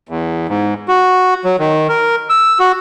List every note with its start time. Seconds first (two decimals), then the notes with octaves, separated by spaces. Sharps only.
0.09 E2
0.49 G#2
0.88 F#4
1.45 F#3
1.59 D#3
1.89 A#4
2.30 E6
2.59 F#4